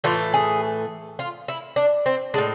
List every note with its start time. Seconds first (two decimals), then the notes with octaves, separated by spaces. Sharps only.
0.04 A2 E3 A3 F4
0.34 G#4
1.19 F4
1.48 E4
1.76 D4
2.06 C4
2.34 G#3 D4
2.38 A2